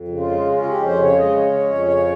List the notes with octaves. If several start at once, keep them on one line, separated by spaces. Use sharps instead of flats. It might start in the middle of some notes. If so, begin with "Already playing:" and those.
Already playing: F2
C#3
F4
G#3
C#4 F4
G4
F2
C5
C#3
C#5
G#3 D#5
C#5
C#4
C#5
F2 C#5
C#3 C#5